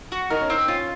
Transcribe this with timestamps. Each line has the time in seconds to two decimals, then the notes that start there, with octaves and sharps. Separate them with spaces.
0.12 F#4
0.30 D#4 A#4
0.41 C#4
0.50 C4 D#4
0.68 C#4 F4